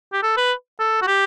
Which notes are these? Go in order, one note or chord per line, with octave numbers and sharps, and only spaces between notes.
G4
A4
B4
A4
F#4
G4